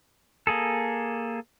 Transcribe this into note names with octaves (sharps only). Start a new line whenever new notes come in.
A#3 G#4 A4